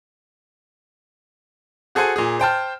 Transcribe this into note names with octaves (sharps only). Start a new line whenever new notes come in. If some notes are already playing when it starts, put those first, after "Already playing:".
F#4 G#4 A4 C5 F#5 G#5
A#2 G#4
C5 G5 A5 F6